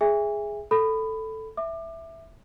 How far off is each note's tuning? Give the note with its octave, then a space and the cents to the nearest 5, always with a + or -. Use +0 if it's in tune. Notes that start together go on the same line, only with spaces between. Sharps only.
G#4 +0 E5 +0 G#5 -35
A4 +5 B5 +15
E5 +0 D6 +25